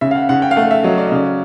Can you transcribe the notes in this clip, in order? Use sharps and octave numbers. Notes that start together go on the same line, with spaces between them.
C#3 E5
F5
F#5
C#3 F#5
G5
F5
A3 F#5
E5
F#3 D#5
D5
D#5
C#3 D5